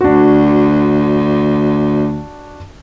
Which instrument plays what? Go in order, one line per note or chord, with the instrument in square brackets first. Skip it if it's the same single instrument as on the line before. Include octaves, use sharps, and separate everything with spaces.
[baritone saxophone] D2 [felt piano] D4 F#4